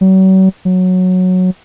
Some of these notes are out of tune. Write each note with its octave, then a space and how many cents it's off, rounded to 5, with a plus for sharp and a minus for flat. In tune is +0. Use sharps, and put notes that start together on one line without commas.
F#3 +40
F#3 -10